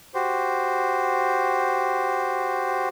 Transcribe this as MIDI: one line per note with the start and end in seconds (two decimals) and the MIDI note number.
0.14 2.89 66
0.14 2.89 67
0.14 2.89 72